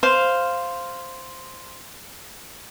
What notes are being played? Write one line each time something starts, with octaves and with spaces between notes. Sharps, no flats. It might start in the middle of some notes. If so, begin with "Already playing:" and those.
C5 F5